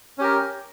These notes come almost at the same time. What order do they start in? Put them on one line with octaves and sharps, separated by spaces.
C#4 G4 A#4